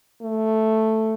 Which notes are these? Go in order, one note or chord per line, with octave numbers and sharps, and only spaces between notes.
A3